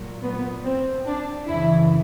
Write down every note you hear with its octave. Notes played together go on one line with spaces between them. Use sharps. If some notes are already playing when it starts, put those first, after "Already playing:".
Already playing: A#2 F#3
B3
C4
D4
F#2 C#3 E3 E4